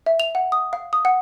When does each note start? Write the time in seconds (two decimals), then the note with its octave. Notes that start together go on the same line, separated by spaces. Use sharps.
0.06 E5
0.20 F7
0.35 F#5
0.52 D#6
0.73 F5
0.93 D#6
1.05 F#5